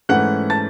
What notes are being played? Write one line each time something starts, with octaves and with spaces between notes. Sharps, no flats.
G#2 E3 A3 C#4 F#5 F#6
A5 A6